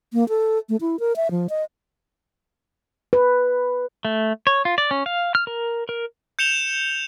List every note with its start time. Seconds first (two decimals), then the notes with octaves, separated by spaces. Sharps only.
0.13 A#3
0.29 A4
0.69 A3
0.81 E4
1.00 A#4
1.16 E5
1.31 F3
1.49 D#5
3.13 B4
4.05 A3
4.47 C#5
4.65 F4
4.78 D5
4.91 C#4
5.06 F5
5.35 F6
5.47 A#4
5.89 A#4
6.39 G6 C#7 E7 F7 G7